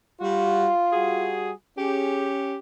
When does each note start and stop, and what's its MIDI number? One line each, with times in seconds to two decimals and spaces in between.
0.21 0.67 55
0.21 1.32 65
0.21 0.67 66
0.92 1.51 55
0.92 1.51 66
0.92 1.51 68
1.78 2.57 61
1.78 2.57 67
1.78 2.29 68